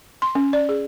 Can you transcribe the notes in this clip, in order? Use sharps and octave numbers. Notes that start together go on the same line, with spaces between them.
C6
C#4
D5
G#4